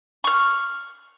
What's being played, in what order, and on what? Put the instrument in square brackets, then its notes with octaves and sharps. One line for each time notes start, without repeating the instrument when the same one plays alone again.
[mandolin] C#6 F6